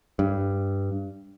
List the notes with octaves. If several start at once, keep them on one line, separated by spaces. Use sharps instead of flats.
G2